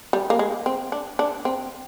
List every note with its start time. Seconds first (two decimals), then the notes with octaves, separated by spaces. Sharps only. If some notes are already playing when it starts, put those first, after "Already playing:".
0.13 G3
0.30 A#3
0.39 G#3
0.66 C4
0.92 D4
1.19 D4
1.45 C4